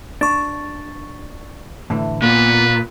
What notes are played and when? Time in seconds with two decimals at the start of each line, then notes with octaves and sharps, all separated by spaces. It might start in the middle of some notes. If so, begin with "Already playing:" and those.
0.21 D4 C#6 A6
1.90 A2 D3 E3
2.22 A#2 A#3 B3 B4